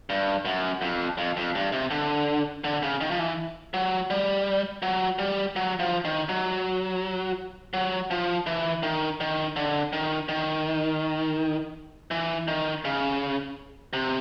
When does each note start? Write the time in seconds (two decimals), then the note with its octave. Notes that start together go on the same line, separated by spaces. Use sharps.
0.10 G2
0.45 F#2
0.82 F2
1.18 F2
1.37 F2
1.55 G2
1.72 C3
1.91 D3
2.64 D3
2.83 C#3
3.01 D#3
3.11 F3
3.19 E3
3.74 F#3
4.10 G3
4.83 F#3
5.19 G3
5.56 F#3
5.80 F3
6.05 D#3
6.29 F#3
7.74 F#3
8.11 F3
8.47 E3
8.83 D#3
9.20 D#3
9.56 D3
9.93 D#3
10.29 D#3
12.11 E3
12.48 D#3
12.85 C#3
13.93 C3